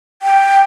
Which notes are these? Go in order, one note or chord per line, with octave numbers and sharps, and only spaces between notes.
G5